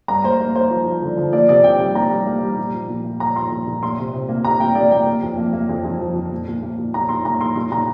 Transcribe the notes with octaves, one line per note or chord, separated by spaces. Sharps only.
G2 A#5
A#3 C5
A#3
A#3 C5
F3
F3
D3
F3
A#3 D5
C3 D5
C3 G5
G3 G5
A#3 A#5
G3
A#3
G3
A#2
F3
A#2
A#3
A#3 A#5
F3 C6
A#2
A#2
A#3 C6
C3
C3
A#3
C3 A#5
A#3 G5
A#3 D5
A#3 G5
A#3
F2
A#3
A#3
F2
F2
F3
F3
A#2
A#2
A#3
A#2
A#2 A#5
A#2 C6
A#3 A#5
A#3 C6
A#2 C6
A#2 A#5